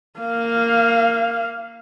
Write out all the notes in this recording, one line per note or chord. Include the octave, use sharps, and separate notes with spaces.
A#3 F5